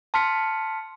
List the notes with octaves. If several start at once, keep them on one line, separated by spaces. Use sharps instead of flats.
A5 C6 F6 B6 C#7